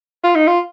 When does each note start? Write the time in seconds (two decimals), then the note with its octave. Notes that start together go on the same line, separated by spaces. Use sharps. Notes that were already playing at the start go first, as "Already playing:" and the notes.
0.23 F4
0.35 D#4
0.47 F4